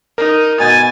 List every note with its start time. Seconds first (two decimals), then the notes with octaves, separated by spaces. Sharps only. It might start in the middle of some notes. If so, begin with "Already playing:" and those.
0.18 D#4 A#4
0.60 B2 E5 G#5 A6